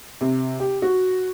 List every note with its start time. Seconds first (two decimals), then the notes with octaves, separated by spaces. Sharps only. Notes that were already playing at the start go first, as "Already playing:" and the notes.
0.21 C3
0.60 G4
0.82 F#4